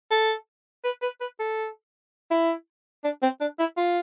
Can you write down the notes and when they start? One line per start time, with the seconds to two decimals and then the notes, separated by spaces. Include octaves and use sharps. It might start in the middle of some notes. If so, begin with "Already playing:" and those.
0.11 A4
0.84 B4
1.02 B4
1.21 B4
1.39 A4
2.31 E4
3.04 D4
3.22 C4
3.41 D4
3.59 E4
3.77 F4